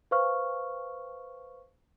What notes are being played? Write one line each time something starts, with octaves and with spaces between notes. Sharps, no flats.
B4 C5 F5 C#6 F6